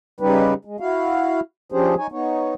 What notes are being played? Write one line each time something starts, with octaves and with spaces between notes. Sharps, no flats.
C#3 G3 D#4 G4 B4
G#3
E4 F#4 F5
F3 C#4 D4 G4 G#4 C5
D#4 C#5 G#5
B3 D#4 C#5